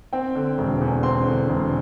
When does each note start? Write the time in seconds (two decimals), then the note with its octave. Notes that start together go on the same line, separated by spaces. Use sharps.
0.13 C4 G5
0.35 D3
0.58 E1
0.81 E2
1.03 C4 C6
1.26 D3
1.49 E1